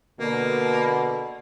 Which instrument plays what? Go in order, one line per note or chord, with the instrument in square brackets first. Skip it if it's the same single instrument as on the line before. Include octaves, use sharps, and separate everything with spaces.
[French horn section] B2 D3 [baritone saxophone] A#3